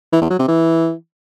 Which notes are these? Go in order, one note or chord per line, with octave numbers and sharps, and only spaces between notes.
E3
E2
F#3
C3
E3